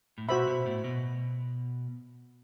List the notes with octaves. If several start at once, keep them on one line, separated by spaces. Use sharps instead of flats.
A2
B2 F#4 C5 E5 B5
B2
A2
B2